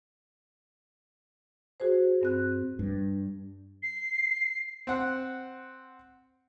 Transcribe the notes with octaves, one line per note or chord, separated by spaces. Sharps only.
F#4 G#4 C5
G2 C4 F#6
G2
C7
C4 F#5